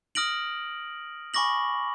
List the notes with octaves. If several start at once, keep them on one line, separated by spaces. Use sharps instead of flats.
D#6 F6 A#6 D7 F#7
G#5 B5 C#6 D6 A#6 F#7